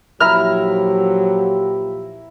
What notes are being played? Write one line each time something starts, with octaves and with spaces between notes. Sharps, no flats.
A#2 F3 F#3 E4 G4 E5 A#5 F6